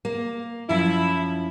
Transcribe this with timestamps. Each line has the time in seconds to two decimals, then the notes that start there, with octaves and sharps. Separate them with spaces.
0.05 A#3
0.69 F#2 F3 E4